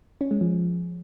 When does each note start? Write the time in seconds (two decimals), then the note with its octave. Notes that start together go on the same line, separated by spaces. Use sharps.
0.21 C#4
0.31 G#3
0.41 F3